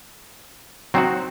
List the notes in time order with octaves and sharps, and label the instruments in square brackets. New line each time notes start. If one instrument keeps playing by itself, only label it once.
[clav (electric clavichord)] F#3 C4 D#4 F#4